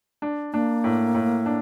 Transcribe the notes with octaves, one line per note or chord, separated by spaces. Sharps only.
D4
A#3 D4
A2
A2
D4